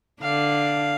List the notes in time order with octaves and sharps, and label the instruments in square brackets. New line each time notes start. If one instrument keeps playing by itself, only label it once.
[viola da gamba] D3 D4 [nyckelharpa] F5